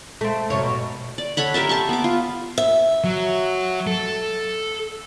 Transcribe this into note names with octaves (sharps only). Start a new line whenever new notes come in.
A3 C4
F#2 C3 C#5
B2
D5
A4 C#5 F#5 B5
G4 A#4 E5 A5
A5 C6 C#6
B3 D6
F4
E5
F#3
A4